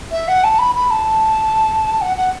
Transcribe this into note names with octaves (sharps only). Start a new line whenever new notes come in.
E5
F#5
A5
B5
B5
A5
F#5
F#5